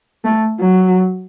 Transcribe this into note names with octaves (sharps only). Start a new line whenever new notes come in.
A3
F#3